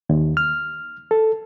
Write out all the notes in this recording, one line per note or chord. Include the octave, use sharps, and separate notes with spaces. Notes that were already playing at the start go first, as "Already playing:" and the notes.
D#2
F6
A4